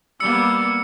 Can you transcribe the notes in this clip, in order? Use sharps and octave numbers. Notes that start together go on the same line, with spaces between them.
G3 A#3 B3 E6 C#7